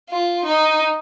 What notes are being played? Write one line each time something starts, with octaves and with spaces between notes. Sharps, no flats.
F4
D#4